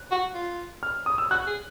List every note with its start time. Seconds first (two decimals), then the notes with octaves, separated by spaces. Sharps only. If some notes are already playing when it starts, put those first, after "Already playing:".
Already playing: F#6
0.11 F#4
0.34 F4
0.83 F6
1.06 D#6
1.18 E6
1.31 F#4 F#6
1.47 G#4